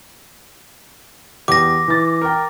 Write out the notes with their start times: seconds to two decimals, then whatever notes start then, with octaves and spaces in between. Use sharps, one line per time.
1.48 E2 G4 D6 A#6
1.88 E3 A6
2.21 A#4 G5